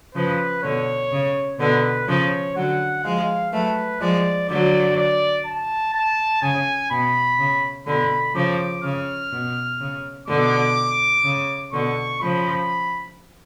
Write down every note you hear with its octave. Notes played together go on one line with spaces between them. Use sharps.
C#3 F3 B4
B2 D3 C#5
C#3
B2 D3 B4
C#3 F3 C#5
D3 F#3 F#5
F3 G#3 F5
F#3 A3 B4
F3 G#3 D5
D3 F#3 D5
D5
A5
A5
C#3 G#5
B2 B5
C#3
B2 D3 B5
C#3 F3 D6
C#3 F6
B2
C#3
B2 D3 D6
C#3
B2 D3 C#6
C#3 F3 B5